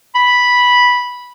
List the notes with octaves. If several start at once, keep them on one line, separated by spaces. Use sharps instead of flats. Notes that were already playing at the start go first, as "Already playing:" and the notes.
B5